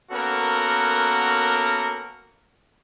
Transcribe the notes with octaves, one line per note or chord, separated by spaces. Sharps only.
A#3 B3 C#4 F#4 A4 A#4